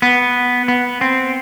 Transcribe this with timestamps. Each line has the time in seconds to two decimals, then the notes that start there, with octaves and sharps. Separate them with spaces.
0.02 B3
0.68 B3
1.01 C4